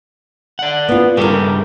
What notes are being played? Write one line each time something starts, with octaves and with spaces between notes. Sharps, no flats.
D5 F#5
B3 F4
G2 C#3 G4 A4 A#4